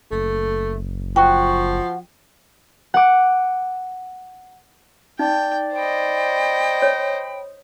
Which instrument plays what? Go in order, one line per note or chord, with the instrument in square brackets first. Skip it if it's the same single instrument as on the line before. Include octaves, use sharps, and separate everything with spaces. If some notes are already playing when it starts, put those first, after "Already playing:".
[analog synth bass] F#1 [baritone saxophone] A3
[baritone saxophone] F3 [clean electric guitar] F#4 [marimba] G5
[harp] F#5 D6
[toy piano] D#4 [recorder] D5 [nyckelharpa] G5
[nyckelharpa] C5 D#5 [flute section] G5 B5
[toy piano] C#5